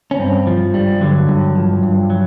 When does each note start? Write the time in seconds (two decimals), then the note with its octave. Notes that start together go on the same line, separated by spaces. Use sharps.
0.11 C#4
0.19 G2 C4
0.47 F3
0.74 G2 G3
1.01 D3 F#3
1.28 G2
1.56 F3
1.83 G2
2.10 F#3